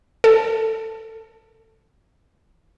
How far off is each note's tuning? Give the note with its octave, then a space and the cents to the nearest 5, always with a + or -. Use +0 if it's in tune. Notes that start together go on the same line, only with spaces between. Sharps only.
A4 +20